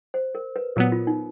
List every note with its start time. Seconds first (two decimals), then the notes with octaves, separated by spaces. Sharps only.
0.14 C5
0.35 A#4
0.56 B4
0.76 A#2 F#3 B3 A#4
0.92 F4
1.07 D#4